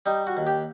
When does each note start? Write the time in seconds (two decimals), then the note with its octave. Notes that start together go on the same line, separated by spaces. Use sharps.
0.06 G3 D#4
0.27 F#4
0.37 D#2
0.47 G4